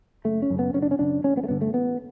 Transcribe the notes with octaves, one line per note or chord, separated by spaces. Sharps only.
F#1 A3
C#4
F#2 C#3
B3
F#1 C#4
D4
C#4
F#2 C#3 D4
A1 C#4
B3
A3
G2 D3 B3
A3
A1 B3